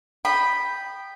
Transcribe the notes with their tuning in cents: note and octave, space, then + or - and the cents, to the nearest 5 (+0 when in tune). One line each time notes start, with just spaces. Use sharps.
G5 +0 B5 +0 D#6 -25